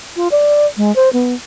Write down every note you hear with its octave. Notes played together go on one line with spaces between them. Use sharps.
F4
D5
G#3
C5
B3